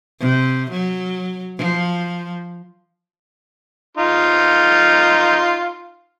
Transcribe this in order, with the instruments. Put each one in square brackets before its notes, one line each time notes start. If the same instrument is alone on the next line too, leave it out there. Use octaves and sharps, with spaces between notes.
[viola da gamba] C3
F#3
F3
[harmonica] D#4 F4 C6